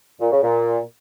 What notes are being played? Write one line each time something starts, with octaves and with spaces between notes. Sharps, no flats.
A#2
C#3
A#2